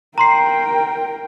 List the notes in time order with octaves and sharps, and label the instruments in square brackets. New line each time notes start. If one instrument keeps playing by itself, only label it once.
[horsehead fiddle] A#4 G5 [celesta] A#5 C6 C7